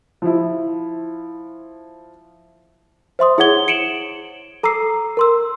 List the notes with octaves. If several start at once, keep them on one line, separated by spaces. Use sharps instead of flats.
F3 E4
C5 E5 C6 D#6
E4 G#4 C#5 F#5 G#6 G7
C#7 D7 E7 F#7
A4 A#5 D6 E6 C7
A#4 C6 E6